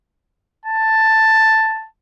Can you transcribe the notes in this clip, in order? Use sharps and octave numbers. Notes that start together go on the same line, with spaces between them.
A5